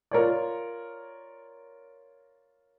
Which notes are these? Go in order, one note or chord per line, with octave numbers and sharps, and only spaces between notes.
F4 A#4 C#5 D5